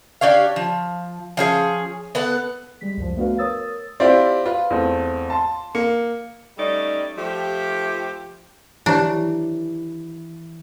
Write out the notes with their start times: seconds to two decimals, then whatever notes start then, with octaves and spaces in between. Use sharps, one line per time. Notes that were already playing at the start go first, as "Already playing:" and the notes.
0.21 D4 G4 C#5 F5
0.56 F3
1.37 F3 C#4 G#4
2.15 B3 A4 F#5
2.81 G3 G#3 B6
2.97 C#2 F#2 F3
3.17 A3 B3 D4 F#4 B4 F5
3.38 A#4 C#5 D#6 E6 A6
4.00 C4 E4 F4 G4 D5
4.46 F4 B4
4.70 E2 A3 C4
5.30 A5 C6
5.75 A#3 C#7
6.58 G3 A3 C#4 D#4 D5
7.17 F3 A3 G4
8.86 E3 D4 E4 G4 C#5